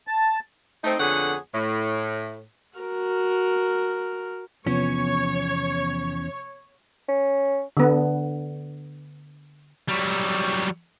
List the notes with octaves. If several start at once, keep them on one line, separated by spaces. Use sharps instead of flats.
A5
A3 C4 D#4
F2 D3 B3 G#4 C#5 F#5
A2
F#4 A#4
E2 C3 F3 B3 C#4 C#5
C#4
D3 B3
F#3 G3